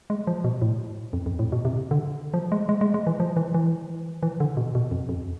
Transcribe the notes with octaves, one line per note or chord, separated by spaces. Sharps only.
G#3
F3
B2
A2
F2
F2
A2
B2
C3
D3
F3
G#3
G#3
G#3
G#3
E3
F3
E3
E3
E3
D3
B2
B2
F2
F2